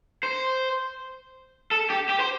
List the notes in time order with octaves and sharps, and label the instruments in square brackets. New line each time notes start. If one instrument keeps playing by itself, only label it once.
[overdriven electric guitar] C5
A4
G4
G4
C5